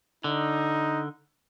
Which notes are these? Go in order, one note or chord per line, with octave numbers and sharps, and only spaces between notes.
D3 D#4